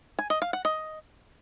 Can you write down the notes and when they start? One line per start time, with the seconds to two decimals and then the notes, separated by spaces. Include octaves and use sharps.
0.19 G#5
0.30 D#5
0.42 F5
0.53 F#5
0.65 D#5